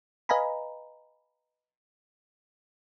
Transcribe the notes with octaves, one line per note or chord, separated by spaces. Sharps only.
B4 D#5 F5 G#5 A#5 B5